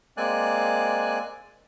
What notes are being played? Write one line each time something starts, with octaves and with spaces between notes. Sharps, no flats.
G#3 A#3 C4 D5 G#5 F#6